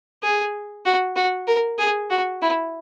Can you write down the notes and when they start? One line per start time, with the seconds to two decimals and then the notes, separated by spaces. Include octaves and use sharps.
0.23 G#4
0.86 F#4
1.16 F#4
1.48 A#4
1.78 G#4
2.10 F#4
2.42 E4